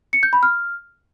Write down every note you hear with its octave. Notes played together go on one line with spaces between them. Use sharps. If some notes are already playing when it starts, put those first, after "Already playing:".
C#7
G6
B5
F6